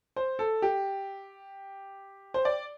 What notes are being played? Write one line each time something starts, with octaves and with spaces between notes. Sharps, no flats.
C5
A4
G4
C5
D5